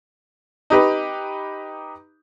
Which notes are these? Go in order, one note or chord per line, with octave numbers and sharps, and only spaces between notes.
D#4 G4 B4